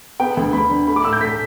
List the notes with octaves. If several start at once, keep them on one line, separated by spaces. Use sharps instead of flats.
B3 G5
D2
D2 B5
D3
A3 B5
D6
A2 E6
G6
A2 B6